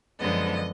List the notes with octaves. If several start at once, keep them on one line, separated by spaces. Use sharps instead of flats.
F#2 D3 F3 G#3 B3 D#5